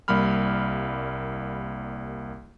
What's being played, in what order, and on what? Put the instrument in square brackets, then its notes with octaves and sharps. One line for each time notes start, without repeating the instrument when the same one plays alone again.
[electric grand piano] C2 G3 A#3 B5 F6